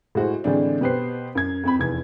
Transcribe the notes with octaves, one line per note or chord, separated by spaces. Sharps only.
A2 G#3 F#4 C5
A2 D3 E3 G#3 C4 D4
B2 G4 B4 C5 C7
F#2 G#6
F2 C4 B5
F1 E2 G#6